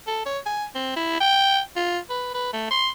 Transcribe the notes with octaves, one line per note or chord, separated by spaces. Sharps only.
A4
C#5
G#5
C4
E4
G5
F4
B4
B4
A3
C6